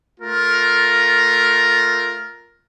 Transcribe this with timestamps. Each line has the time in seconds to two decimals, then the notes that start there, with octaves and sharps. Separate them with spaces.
0.20 A3 F4 A#4